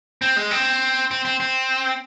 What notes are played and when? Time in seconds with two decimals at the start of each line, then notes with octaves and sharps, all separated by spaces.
0.22 C4
0.36 G#3
0.51 C4
1.11 C4
1.25 C4
1.40 C4